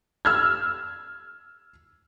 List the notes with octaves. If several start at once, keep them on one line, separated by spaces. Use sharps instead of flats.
E6 F6 G#6